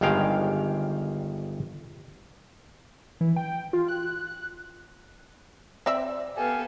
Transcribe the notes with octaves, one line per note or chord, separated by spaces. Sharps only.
G1 G2 D#3 G#3 F5 G5
E3
G5
F4
F#6
C4 D5 E5
B3 G4 A4 F5 G#5